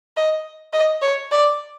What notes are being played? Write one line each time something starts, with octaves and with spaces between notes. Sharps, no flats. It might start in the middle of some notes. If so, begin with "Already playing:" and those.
D#5
D#5
C#5
D5